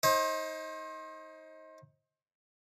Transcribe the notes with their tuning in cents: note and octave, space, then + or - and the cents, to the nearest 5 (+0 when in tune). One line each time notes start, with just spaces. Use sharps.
D#4 +25 C5 +35